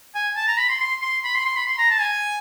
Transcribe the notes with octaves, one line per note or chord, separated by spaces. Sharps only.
G#5
A5
A#5
B5
C6
C6
C6
B5
C6
C6
B5
C6
A#5
A5
G#5